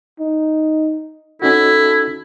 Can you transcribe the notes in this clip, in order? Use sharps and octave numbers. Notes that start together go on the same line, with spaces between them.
D#4
C#4 D#4 E4 F#4 A4